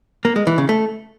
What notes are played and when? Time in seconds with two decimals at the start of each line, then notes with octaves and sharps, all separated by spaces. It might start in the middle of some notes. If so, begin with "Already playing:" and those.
0.25 A#3
0.36 G#3
0.47 E3
0.58 C#3
0.69 A3